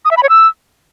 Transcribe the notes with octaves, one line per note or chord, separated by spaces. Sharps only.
D#6
E5
B5
C#5
E6